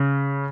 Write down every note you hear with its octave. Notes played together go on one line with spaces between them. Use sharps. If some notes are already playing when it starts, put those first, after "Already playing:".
Already playing: C#3